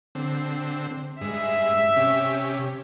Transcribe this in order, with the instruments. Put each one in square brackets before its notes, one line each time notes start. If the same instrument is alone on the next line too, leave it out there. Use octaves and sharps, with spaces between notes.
[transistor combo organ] D3 C4
[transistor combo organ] G2 G#3 [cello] E5
[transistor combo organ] C3 C#4 G4